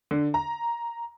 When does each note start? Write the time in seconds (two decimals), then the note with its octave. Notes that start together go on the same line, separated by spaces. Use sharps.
0.11 D3
0.34 A#5